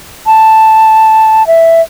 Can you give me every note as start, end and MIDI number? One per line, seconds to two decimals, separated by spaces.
0.27 1.46 81
1.47 1.81 76